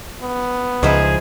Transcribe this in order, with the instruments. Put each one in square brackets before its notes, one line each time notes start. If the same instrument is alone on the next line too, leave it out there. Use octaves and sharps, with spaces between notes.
[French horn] B3
[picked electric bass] C#2 [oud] F3 D#4 E4 [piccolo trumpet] G#4